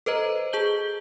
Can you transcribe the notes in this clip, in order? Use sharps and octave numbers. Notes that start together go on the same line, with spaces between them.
A4 B4 C5 D#5 A#5
G#4 A5 G6 F#7 G7